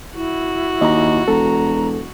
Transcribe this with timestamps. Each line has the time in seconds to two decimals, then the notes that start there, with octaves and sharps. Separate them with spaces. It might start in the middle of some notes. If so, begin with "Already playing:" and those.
0.16 E4 F#4
0.81 D#2 D#5 A#5
1.28 E1 A4 A#5